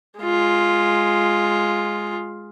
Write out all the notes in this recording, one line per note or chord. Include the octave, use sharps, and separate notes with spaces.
G#3 F4